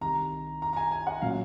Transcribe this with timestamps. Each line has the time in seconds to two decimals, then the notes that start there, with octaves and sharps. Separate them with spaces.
0.01 C2 C3 D#3 A#5
0.62 A#5
0.73 A#5
0.76 G#5
0.91 G#5
1.07 F#5
1.22 A#2 F#3 C#4 F5